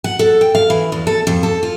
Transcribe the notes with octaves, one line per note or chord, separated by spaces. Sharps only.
F#5
A4
G5
F5
E3
E2
A4
F2
A4
F4